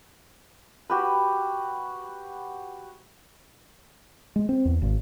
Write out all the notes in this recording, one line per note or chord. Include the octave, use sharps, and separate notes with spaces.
F#4 G4 B4
G#3
C4
E2
G#1